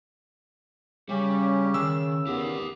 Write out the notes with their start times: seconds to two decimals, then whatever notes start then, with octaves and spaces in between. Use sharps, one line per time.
1.09 C#3 G3 C#4 G4
1.74 D#3 E6
2.27 E2 D#3 B3 G4 A#4